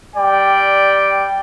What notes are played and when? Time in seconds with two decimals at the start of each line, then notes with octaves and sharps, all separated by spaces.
0.16 G3 D5 G5